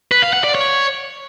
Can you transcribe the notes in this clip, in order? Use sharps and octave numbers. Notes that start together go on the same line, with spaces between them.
B4
F5
F#5
D5
C#5